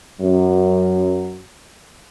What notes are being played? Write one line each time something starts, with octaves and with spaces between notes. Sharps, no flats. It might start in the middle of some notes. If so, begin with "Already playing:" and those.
F#2 F#3